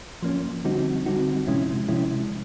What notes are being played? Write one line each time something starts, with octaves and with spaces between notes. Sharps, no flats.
F3 A#3 C#4
D3 G3 C4 D#4 F#4
D3 G3 C4 D#4 F#4
C3 F3 G#3 C#4 E4
C3 F3 G#3 C#4 E4